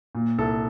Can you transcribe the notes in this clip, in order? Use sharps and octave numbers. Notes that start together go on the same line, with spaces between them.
A#2
C2 A4